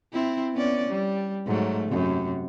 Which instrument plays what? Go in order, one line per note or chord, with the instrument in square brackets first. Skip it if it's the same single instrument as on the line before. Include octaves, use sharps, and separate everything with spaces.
[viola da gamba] C4 E4
B3 C#4 D5
G3
G#2 F#3 A3
F#2 C3